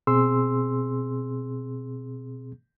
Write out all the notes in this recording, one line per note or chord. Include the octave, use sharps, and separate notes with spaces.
B2 C4 G#4 C6 E6